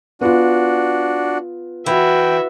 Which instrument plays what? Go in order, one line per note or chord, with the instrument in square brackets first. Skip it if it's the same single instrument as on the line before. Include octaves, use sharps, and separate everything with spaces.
[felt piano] B3 F4 [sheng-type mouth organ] D4 F#4
[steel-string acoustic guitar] E3 [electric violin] F#4 E5 [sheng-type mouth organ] G5